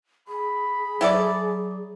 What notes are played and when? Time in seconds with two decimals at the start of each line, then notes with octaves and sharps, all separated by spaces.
0.28 G#4 B5
1.01 F#3 E4 A4 D5